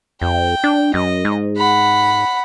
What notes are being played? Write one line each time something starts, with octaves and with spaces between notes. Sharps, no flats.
F2 G5
D4
F#2 D#5
G#2
F#5 B5